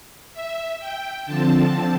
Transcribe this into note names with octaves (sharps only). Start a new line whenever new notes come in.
E5
G5
D3 F3 C4 A5